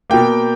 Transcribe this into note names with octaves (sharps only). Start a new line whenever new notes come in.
B2 A#3 G5